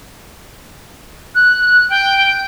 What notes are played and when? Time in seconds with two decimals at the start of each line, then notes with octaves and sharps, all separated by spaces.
1.35 F#6
1.90 G5